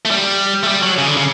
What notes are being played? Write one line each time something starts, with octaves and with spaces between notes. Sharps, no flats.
A3
G3
A3
G3
F#3
C#3
D3
C#3